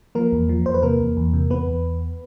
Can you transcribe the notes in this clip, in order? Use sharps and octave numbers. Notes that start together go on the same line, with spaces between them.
F3 A#3 A#4
E2
F3
E2 C5
B4
C3 A#3 A#4
E2
E2
C3
E2 B3 B4
E2